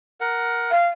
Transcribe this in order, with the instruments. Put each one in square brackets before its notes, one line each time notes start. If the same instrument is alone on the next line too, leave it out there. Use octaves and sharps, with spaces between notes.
[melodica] A#4 F#5
[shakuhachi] F5